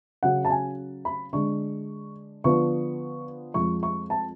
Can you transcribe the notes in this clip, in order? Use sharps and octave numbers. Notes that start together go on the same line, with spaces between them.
C#3 F#3 C#4 F#5
A5
G#5
B5
D3 G#3 D4 C#6
D3 F3 B3 D4 C#6
F2 F3 G#3 C#6
C#6
A5